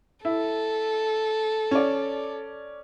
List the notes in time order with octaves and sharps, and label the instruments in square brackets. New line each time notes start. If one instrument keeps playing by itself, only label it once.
[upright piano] E4 [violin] A4
[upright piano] C#4 D5